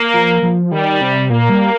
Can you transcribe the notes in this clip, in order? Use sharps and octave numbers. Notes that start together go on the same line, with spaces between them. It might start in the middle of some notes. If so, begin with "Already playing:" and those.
Already playing: A#3
F3
F3
D#3 G3
C3
A#2 A#3
G3